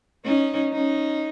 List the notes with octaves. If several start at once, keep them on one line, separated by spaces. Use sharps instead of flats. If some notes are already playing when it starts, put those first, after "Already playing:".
C#4 D#4
C#4 D#4